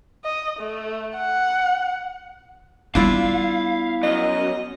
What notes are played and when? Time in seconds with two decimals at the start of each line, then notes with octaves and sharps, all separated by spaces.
0.25 D#5
0.59 A3
1.17 F#5
2.95 G3 B3 D4 E4 F4 F5
4.03 F#2 D#5